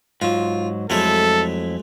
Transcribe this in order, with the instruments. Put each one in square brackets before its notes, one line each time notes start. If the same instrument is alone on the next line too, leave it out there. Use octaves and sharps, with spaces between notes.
[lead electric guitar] G#2 F#3 [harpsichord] F4
[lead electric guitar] F2 E4 [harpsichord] F#3 G#3 A3 [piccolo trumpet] A4